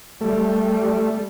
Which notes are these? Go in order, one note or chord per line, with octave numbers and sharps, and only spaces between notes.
G3 A3